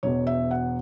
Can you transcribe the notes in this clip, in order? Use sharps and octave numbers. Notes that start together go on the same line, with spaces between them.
E1 E2 B2 C#5
E5
F#5